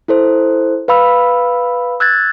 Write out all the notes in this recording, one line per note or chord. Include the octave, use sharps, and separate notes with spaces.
E4 A4 C5
B4 F5 B5 E6
E6 F#6 G#6 A6